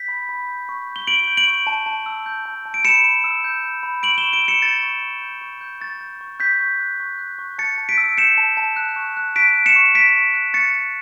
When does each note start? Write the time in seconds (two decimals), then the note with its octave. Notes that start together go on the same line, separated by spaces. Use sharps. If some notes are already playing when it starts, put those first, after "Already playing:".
Already playing: G6 B6
0.08 B5
0.29 B5
0.48 G6
0.69 C#6
0.87 G6
0.96 G7
1.07 C#6 D7 F#7
1.27 G6
1.37 D7 F#7
1.48 C#6
1.67 A5
1.86 A5
2.06 E6
2.26 G6
2.46 A5
2.66 A5
2.74 D7
2.85 B5 C#7 E7
3.04 B5
3.24 E6
3.44 G6
3.64 B5
3.83 B5
4.03 C#6 D7 F#7
4.18 E7 G7
4.23 C#6
4.33 D7 F#7
4.43 E6 C#7 E7
4.62 G6 A6 C#7
4.83 C#6
5.03 C#6
5.22 G6
5.41 C#6
5.61 G6
5.81 C#6 A6
6.01 G6
6.21 C#6
6.40 F#6 G6 B6
6.60 C#6
6.80 F#6
7.00 C#6
7.19 F#6
7.39 C#6
7.58 A5 A6 C#7
7.78 A5
7.89 B6 D7
7.98 E6
8.18 G6 C#7 E7
8.38 A5
8.57 A5
8.76 F#6
8.96 C#6
9.17 F#6
9.36 C#6 B6 D7
9.55 F#6
9.66 C#7 E7
9.76 C#6
9.95 F#6 B6 D7
10.15 C#6
10.34 F#6
10.54 C#6 A6 C#7
10.74 F#6